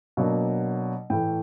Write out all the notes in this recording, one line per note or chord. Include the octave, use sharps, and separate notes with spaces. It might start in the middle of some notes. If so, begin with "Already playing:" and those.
B2 F#3 A#3 D4
A2 E3 A3 G5